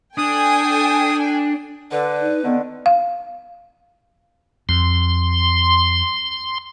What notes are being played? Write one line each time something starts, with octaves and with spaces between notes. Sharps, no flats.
D4 A4 G5 G#5 D#6
D3 B4
D#4
D3 D#3 B3
F5
F2 C6